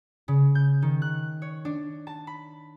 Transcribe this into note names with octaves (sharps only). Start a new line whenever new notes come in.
C#3
G6
D#3
F#6
C#5
D4
A5
B5